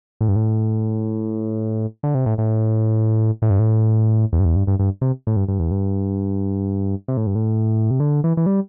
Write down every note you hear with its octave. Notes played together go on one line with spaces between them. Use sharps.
A2
G2
A2
D3
C3
A2
A2
A2
G2
A2
E2
G2
E2
G2
G2
G2
C3
A2
G2
G2
E2
G2
C3
A2
G2
A2
C3
D3
E3
E3
G3